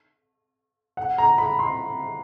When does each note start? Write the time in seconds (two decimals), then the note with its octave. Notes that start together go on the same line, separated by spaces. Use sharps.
0.97 F#5
1.18 A#5
1.38 B5
1.59 C6